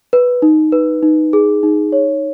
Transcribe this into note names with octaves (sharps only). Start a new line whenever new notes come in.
B4
D#4
B4
D#4
G#4
D#4
C#5